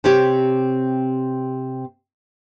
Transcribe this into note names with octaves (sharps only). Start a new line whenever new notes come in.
C3 C4 G4 C#5